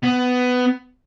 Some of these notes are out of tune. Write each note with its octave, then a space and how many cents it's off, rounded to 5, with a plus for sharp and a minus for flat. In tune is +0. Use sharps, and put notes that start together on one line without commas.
B3 +15